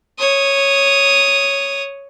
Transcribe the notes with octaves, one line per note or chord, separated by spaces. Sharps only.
C#5 D#6